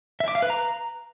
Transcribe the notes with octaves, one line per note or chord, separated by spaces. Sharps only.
E5
D6
F5
B4
A#5